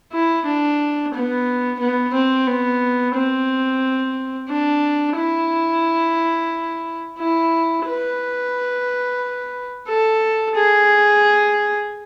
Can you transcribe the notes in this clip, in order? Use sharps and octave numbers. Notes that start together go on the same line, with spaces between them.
E4
D4
B3
B3
C4
B3
C4
D4
E4
E4
B4
A4
G#4